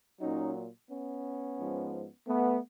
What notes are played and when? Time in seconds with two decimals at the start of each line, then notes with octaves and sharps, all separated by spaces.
0.21 A#2 F#3 C#4 D#4
0.90 B3 C#4
1.59 G#2 F3
2.27 A3 B3